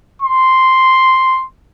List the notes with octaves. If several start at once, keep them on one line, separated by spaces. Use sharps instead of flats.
C6